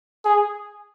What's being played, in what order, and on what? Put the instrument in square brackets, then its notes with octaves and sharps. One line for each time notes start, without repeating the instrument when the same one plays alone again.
[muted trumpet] G#4